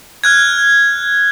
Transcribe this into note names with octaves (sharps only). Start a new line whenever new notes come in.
F6 F#6 G#6